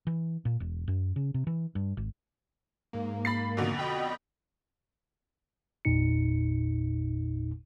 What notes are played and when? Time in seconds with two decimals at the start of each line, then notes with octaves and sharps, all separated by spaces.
0.07 E3
0.45 A#2
0.60 E1
0.88 F#2
1.16 C#3
1.34 C3
1.47 E3
1.75 G2
1.97 G#1
2.93 G#2 A#3
3.25 B5 A6 C7
3.57 F2 B2 D3
3.77 D#5 G5 B5
5.85 G#1 E2 A#2 D#4 C#7